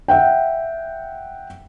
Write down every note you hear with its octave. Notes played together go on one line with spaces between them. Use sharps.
E5 F#5 G5